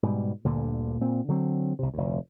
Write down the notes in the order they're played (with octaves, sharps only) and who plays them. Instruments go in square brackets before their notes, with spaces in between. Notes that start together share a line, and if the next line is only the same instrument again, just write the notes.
[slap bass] G#2 B2 G3
D2 G2 A#2 D3
A#2 C4
D3 F#3 C4
C2 C3
F1 D2